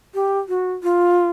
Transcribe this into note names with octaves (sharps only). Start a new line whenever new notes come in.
G4
F#4
F4